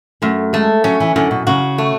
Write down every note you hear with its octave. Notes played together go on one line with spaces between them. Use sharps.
F#2 A3
G#3 A3
F#3 C#4
E3
F#2 D3
B2
C#3 F#4
A3